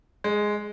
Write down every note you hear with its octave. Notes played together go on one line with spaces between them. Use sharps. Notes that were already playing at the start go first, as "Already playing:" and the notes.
G#3